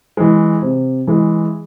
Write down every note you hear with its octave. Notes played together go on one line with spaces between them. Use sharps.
E3 G#3
C3
E3 G#3